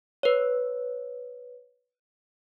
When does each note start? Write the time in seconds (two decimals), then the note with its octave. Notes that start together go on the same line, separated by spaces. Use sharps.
0.23 B4 C#5